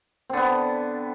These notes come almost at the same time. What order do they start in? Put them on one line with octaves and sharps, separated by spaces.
C4 D3 B3